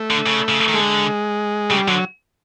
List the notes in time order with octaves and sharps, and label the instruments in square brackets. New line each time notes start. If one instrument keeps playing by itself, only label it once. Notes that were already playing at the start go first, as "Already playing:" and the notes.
Already playing: [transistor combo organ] A3
[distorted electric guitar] D3
C#3
C#3
D#3
[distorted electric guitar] D3 [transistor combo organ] G#3
[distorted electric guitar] C#3 [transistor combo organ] G3
[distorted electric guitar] D3 [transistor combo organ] F#3